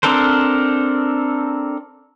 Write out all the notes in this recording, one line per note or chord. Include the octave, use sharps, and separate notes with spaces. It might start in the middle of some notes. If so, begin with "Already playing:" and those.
C4 D4 A4 A#4 C5